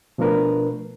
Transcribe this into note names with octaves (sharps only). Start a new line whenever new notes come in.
B2 F3 A3 D4 A#4 B4